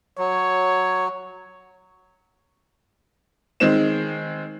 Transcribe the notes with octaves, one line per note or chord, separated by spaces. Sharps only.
F#3 C#5
D#3 G#3 C4 E7